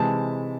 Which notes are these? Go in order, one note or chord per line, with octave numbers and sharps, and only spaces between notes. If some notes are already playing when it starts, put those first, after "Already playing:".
Already playing: C3 E3 G#3 A5